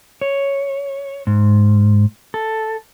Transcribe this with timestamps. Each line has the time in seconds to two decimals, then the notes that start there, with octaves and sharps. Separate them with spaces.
0.21 C#5
1.27 G#2
2.34 A4